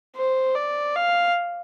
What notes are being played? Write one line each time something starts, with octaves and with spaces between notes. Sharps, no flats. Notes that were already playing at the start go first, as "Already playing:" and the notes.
C5
D5
F5